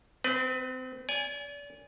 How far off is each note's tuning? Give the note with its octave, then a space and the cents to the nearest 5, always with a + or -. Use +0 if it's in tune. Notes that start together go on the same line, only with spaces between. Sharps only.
C4 -30 B4 +15
D5 -35 G#5 -10